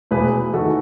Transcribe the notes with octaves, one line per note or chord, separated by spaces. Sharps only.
E1 G#4 B4
E2 D#3 F#4 A4